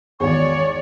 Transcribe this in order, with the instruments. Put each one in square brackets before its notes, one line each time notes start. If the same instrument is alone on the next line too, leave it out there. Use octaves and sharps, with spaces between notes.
[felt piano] G#1 E2 [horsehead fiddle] C#5 D5 [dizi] C#6